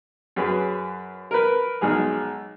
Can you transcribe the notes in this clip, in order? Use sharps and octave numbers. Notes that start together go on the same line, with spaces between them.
F#2 G#4 B4
A#4 B4
B1 G#3 G#4 F6